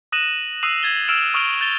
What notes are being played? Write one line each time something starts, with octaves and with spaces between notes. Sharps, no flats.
D#6 F#6 A#6 D#7 E7 F#7
D#6 E6 F#6 C7 D#7 F7
G#6 A6 G7
E6 F6 D7 E7 F7
C#6 D#6 F6 D7 F7 G7
G6 A6 E7 F7 G7